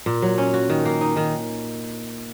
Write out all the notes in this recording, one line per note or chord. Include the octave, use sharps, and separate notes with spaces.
A#2
F#3
C#4
F#4
D#3
A#3
D#4
D#3